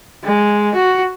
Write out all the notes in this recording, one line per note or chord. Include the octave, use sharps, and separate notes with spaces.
G#3
F#4